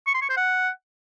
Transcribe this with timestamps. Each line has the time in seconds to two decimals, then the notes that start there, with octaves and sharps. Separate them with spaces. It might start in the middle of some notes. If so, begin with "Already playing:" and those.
0.07 C#6
0.14 C6
0.22 C#6
0.29 C5
0.37 F#5